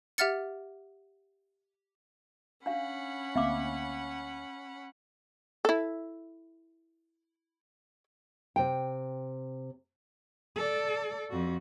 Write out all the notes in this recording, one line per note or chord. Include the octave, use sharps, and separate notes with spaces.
G4 E5 F#5 F6 A6 C#7
C#4 D4 F5 F#5 B5
D2 A#3 C4 E5 F5 D6
E4 A4
C3 G5
A4 D5
F2 F#4